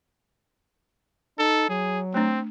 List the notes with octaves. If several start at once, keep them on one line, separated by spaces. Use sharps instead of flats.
D#4 A4
F#3 G#4
A3 C4 D4